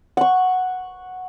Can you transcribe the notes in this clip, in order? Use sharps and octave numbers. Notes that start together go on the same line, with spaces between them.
F#5 C#6